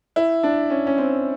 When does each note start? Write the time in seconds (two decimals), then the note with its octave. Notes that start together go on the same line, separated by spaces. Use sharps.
0.16 E4
0.43 D4
0.70 C#4
0.87 C#4
0.98 C4